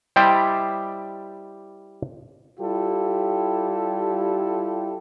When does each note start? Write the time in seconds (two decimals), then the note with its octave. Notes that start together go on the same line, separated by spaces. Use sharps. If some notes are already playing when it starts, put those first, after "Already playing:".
0.16 G3 E4 G4 C5 D5 D#5
2.60 G3 E4 F4 G4 A4